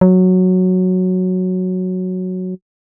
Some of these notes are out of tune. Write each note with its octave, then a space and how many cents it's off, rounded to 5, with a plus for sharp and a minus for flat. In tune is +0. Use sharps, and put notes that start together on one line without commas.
F#3 -5